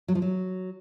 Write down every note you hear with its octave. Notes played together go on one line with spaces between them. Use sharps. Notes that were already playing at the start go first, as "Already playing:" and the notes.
F#3
F3
F#3